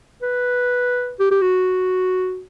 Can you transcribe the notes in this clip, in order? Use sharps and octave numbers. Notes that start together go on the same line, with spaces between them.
B4
G4
G4
F#4